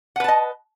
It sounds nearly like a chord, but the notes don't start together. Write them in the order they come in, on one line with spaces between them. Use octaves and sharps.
F#5 B4 A5 D#5